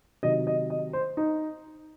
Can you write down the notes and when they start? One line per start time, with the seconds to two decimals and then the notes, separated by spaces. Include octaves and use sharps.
0.23 C3 D#3 F#3 D#5
0.47 D#5
0.70 D#5
0.93 C5
1.17 D#4